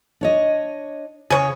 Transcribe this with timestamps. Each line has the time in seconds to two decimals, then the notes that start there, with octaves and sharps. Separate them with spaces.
0.21 D4 C#5 D#5
1.30 C#3 G#4 C#5